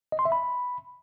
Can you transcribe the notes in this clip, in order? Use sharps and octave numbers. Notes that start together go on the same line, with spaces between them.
D#5
C6
E5
B5